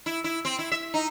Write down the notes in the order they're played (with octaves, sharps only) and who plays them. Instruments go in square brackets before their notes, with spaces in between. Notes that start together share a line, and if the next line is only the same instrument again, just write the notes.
[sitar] E4
E4
C4
E4
E5
D#4